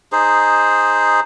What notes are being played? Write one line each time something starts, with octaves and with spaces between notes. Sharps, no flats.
D#4 G#4 C5